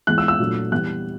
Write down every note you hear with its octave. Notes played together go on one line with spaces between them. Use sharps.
E3 G#3 B3 F#6
E6
E6
A#2 F#3 A3 D4
E3 G3 B3 F#6